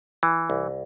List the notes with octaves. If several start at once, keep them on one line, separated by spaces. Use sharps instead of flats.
E3
C2